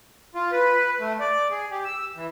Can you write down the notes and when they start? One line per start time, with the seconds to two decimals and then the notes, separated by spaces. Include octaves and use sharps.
0.35 F4
0.52 B4
1.00 A3
1.20 D5
1.51 G#4
1.71 G4
1.85 E6
2.16 E3